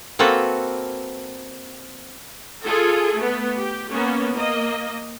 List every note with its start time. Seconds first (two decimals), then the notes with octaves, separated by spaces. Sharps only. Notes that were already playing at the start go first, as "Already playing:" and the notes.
0.19 A#3 C4 F#4 A4 B4
2.64 F4 G#4 A4
3.16 A3 B3
3.59 G4
3.91 A#3 B3 C#4
4.34 A#3 D#5